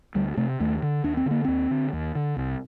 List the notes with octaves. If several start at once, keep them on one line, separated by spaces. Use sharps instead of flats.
D2 G3
C3 A3
D#2 A3
D3
D#2 D4
C4
D3
A#3
D#2 C4
D3
D#2
D3
C2